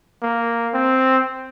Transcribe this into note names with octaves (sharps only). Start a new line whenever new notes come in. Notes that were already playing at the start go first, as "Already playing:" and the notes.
A#3
C4